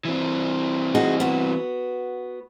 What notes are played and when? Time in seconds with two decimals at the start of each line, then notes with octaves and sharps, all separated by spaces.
0.05 E3 C4
0.95 D#4 F#4 G#4
1.20 B3 F#4